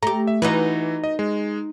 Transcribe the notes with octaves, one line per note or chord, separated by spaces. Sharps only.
A3 G4 A#5
E5
E3 D#4 F#4 B4
D#5
G#3